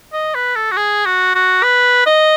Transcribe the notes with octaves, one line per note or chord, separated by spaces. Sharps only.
D#5
B4
A4
F#4
G#4
F#4
F#4
B4
D#5